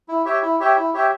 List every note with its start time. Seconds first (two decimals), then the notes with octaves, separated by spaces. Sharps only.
0.08 E4
0.25 G4 C#5 E5 G5
0.42 E4
0.60 G4 C#5 E5 G5
0.77 E4
0.94 G4 C#5 E5 G5